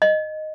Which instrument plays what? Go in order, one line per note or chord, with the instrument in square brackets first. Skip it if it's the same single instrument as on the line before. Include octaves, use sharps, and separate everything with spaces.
[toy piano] D#5